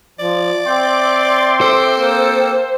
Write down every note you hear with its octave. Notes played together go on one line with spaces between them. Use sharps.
F3 D5
C4 E5 G5 C6 D6
A4 C5
A#3